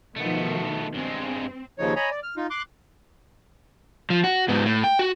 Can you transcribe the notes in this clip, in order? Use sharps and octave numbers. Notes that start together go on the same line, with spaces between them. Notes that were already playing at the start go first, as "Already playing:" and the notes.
B2 D#3 F3 A3 B3
G2 G#3 C4
D#2 C#3 F3 D#4 C#5
C#5 D#5 G#5 A#5 B5
D5
F6
D#4 F4
C6 D6 F#6
F3
F#4
G#2 B3
A2
G5
F#4